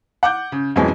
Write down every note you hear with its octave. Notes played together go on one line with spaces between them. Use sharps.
F#5 D6 G6
C#3
F2 B2 E3 F#3 G#3 C#4